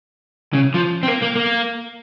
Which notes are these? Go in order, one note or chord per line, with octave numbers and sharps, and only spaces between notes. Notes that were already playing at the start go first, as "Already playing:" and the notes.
C#3
F3
C4
A#3
A#3
A#3